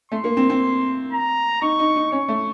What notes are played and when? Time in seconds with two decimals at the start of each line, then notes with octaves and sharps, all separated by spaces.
0.11 A3 C6
0.24 A#3
0.37 C4
0.50 C4
1.12 A#5
1.62 D#4 C#6
1.79 D#4
1.96 D#4
2.12 C#4 C#6
2.28 A3